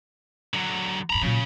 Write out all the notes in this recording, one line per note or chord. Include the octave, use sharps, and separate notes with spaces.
D3 F#3
G2 D3 A#5 B5
A#2 C#3 F#3